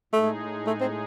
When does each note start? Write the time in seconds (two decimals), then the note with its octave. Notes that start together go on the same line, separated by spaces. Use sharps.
0.13 A2 G#3 A3 D#4 G#4
0.67 A3
0.80 C4